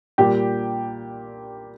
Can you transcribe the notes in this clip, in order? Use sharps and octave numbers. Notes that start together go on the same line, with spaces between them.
A#2 G3 G4 G5